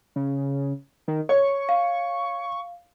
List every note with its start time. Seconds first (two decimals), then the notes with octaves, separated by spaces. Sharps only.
0.16 C#3
1.08 D#3
1.29 C#5 C#6
1.69 F5